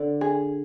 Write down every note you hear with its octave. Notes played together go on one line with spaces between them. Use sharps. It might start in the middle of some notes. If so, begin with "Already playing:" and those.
Already playing: D3 D5
G#4